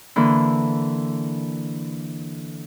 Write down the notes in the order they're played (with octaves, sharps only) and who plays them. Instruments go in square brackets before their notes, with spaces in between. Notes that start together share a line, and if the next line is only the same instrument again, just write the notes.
[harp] D3 E3 A#3